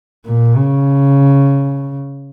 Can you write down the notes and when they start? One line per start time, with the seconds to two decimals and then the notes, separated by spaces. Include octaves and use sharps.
0.26 A#2
0.56 C#3